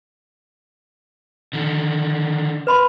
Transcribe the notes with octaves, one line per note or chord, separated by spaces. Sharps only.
D3 D#3
B4 B5 C6